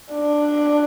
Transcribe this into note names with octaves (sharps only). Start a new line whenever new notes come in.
D4